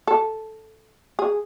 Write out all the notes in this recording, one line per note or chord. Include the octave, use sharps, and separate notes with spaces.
A4
G#4